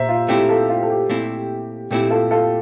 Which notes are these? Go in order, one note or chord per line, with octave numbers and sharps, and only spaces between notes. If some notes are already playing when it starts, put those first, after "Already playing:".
Already playing: A#2 C5 E5 A#5
F4
A#2 A3 C4 E4 G4
F4 A4
F4
A4
G4
A#2 A3 C4 E4
A#2 A3 C4 E4 G4
F4 A4
F4 A4